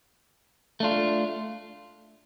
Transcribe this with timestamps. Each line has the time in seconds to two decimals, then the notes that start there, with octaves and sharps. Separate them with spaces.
0.80 A3 D4 F4